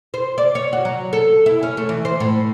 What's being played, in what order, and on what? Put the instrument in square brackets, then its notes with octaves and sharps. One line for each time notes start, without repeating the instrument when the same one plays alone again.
[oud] C5
D5
C#5
F#4
F#3
A4
E4
C#4
A3
E3
C5
A2